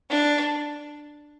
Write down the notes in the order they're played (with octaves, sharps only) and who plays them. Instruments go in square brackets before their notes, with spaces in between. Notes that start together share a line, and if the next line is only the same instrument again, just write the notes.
[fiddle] D4